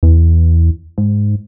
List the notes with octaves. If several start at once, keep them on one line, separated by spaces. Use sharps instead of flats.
E2
G#2